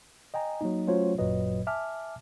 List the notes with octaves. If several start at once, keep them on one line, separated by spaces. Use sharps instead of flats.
D#5 G5 G#5 A#5
F#3 A#3 D#4
F#3 A3 C#4 F4 C5 C#5
G#1 F#2 A#2 F#3 B4 D#5
E5 G#5 A5 D6 F6